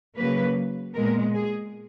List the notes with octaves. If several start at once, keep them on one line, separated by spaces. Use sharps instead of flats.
C#3 F#3 A#3 B4
A#2 G#3 B3 A#4
G#4